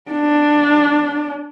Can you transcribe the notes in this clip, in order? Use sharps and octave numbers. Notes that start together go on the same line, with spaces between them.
D4